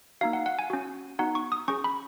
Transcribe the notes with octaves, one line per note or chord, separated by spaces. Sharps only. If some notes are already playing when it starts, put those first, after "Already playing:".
A#3 D#4 F#4 F5
F#5
F#5
G#5
C#4 F#4
B3 D#4 F#4 F#5
C#6
D#6
C#4 G#4 C#6
B5